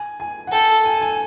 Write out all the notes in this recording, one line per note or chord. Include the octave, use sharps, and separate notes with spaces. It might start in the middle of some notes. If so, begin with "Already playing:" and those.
Already playing: G#5
G#5
F#5
A4 G5
G#5
G#5